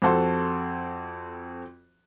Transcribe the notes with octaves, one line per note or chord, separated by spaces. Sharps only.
F2 C4 F#4 A4 C6